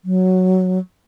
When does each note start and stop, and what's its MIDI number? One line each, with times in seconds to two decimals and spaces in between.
0.05 0.79 54